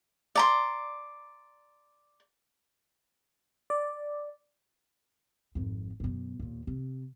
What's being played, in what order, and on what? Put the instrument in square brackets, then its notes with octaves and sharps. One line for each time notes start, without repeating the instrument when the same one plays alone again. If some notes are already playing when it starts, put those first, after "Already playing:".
[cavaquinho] D5 A#5 C6
[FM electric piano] D5
[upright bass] G#1 F2
F#2 B2
D#2 A#2
C3